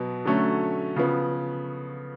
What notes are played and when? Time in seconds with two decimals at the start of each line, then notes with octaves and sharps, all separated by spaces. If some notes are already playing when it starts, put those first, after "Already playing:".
Already playing: B2 F#3 B3
0.25 D3 F#3 A3 C#4
0.96 C#3 F3 B3